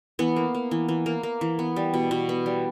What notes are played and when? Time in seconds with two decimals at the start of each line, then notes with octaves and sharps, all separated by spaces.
0.19 E3 B3
0.36 A#3
0.54 A#3
0.71 E3
0.88 E3
1.06 A#3
1.23 A#3
1.41 E3
1.59 B3
1.76 G3
1.94 B2
2.11 B2
2.29 B3
2.46 G3